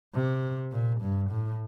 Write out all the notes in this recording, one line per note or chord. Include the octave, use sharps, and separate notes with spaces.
C3
A#2
G2
A2